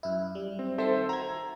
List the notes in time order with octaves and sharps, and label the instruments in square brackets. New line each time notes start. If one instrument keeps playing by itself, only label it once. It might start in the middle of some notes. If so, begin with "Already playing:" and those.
[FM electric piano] F#2 E4
G3
[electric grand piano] C4
[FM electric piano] D#3 C4 C6 [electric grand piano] A4 C5 E5
[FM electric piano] F#4 G#6 [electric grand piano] A#5